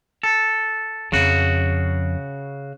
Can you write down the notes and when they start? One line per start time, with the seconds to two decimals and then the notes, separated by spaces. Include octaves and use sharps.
0.23 A4
1.12 F2 C#3 F#4